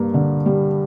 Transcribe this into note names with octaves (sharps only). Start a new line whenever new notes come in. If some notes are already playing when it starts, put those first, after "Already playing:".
Already playing: G2 A#3
D3
G3